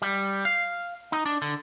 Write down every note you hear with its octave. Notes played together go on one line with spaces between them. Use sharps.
G3
F5
D#4
D4
D3